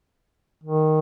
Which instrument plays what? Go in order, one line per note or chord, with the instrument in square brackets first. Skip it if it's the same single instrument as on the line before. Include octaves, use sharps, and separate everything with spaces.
[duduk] D#3